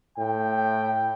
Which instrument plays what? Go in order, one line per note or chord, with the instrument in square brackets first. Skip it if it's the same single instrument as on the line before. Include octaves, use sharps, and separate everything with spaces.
[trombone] A2 [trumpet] G5